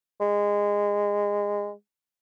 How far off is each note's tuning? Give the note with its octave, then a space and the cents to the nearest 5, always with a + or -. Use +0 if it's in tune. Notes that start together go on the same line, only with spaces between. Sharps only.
G#3 -20